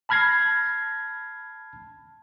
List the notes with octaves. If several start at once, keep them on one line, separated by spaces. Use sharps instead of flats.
A5 B5 F6 G#6 A#6 C7